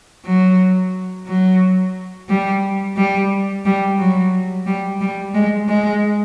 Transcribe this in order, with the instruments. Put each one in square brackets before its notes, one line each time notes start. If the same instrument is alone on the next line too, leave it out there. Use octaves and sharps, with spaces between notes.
[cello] F#3
F#3
G3
G3
G3
F#3
G3
G3
G#3
G#3